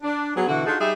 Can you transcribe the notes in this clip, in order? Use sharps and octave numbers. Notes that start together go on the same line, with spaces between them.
D4
F#3 B3 G#4
B2 D3 E3 F#4
D4 D#4 F4 F#4 G#4 A4
G3 D#4 G4 G#4 E5